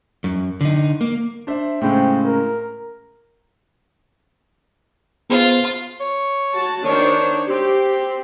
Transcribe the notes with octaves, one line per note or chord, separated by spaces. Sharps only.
F#2
D3 D#4
A#3
D4 C5 E5
A2 C#3 G#3 C4
A#4
B3 F4 G#4 C5
C#5
F#4 A5
D#3 D4 C5 C#5
C4 G4